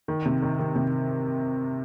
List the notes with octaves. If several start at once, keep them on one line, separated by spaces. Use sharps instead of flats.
D#3
C3
D#3
D#3
C3